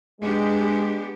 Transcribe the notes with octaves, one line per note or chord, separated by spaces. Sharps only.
G#3 B3 D4 G4